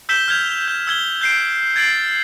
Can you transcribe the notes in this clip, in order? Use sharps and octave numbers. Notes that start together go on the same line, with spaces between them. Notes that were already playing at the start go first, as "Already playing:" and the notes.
E6 G6 B6 E7 G7
F6 G6 G#6 F7
G6
E6 G#6 G7
G6 C7 D7
G#6 A6 C7 D7 F#7